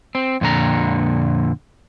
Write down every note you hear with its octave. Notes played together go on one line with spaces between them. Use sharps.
C4
F2 A#2 D3 A#5